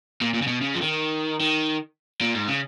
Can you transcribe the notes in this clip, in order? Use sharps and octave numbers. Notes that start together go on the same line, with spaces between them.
A#2
A#2
C#3
B2
C#3
F3
D#3
D#3
A#2
G#2
C#3